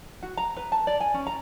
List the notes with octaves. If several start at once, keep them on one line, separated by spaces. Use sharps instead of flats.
F#4
A#5
B4
A5
D5
G#5
C#4
A#5